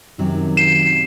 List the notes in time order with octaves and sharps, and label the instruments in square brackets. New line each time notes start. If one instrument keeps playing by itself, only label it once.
[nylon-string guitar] F#2 C3 F#3 [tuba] D#3
[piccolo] C7 [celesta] E7